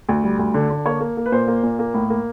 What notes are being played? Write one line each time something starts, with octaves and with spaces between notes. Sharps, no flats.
D2
G3
D2
D3
D3
A#3 C#5
A#3
A#3
B4
A#2 C5
A#3
A#2
A#3
A2
A#3